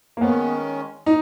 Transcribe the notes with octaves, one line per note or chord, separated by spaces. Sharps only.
A#3
D#3 G#3 B3 C#4
D#4